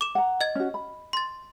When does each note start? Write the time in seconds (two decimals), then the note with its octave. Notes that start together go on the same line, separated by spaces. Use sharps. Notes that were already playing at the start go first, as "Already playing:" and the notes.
0.01 D6 E7
0.15 F#5 A#5
0.41 D#5 G#6
0.55 C#4 F#4
0.74 B5
1.13 C6 A6